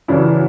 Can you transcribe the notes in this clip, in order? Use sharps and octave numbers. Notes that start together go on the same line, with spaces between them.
F#2 C#3 E3 D4 E4